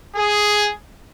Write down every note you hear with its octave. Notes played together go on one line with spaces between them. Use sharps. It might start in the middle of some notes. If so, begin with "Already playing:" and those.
G#4